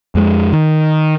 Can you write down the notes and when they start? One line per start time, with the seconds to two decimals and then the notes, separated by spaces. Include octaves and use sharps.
0.15 F2 G#3
0.53 D#3